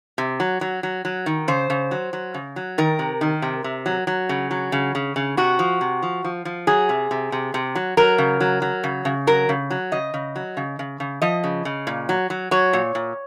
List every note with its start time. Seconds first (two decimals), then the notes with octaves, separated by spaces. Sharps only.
0.18 C3
0.40 F#3
0.61 F#3
0.83 F#3
1.05 F#3
1.26 D#3
1.48 C#3 C5
1.70 C#3
1.91 F#3
2.13 F#3
2.34 C#3
2.56 F#3
2.78 D#3 A#4
2.99 C3
3.21 D#3
3.42 C3
3.64 C3
3.86 F#3
4.07 F#3
4.29 C#3
4.51 F#3
4.72 C#3
4.95 C#3
5.16 C#3
5.37 C3 F#4
5.59 F3
5.81 C3
6.02 F3
6.24 F3
6.45 F3
6.67 F#3 G#4
6.89 C3
7.11 C3
7.32 C3
7.54 C3
7.75 F#3
7.97 F#3 A#4
8.18 C#3
8.40 F#3
8.62 F#3
8.84 C#3
9.05 C#3
9.27 F#3 A#4
9.49 C#3
9.70 F#3
9.92 C#3 D#5
10.14 C#3
10.36 F#3
10.57 C#3
10.79 C#3
11.00 C#3
11.22 F3 D#5
11.44 C#3
11.65 C#3
11.87 A#2
12.09 F#3
12.30 F#3
12.51 F#3 C#5
12.73 A#2
12.95 A#2